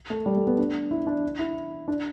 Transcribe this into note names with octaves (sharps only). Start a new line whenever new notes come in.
A3
G3
A3
B3
D4
E4
D4
E4
D4